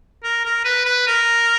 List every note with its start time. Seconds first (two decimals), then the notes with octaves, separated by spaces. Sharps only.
0.24 A#4
0.45 A#4
0.65 B4
0.85 B4
1.07 A#4